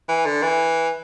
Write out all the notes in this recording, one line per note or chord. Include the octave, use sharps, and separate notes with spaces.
E3
D3
E3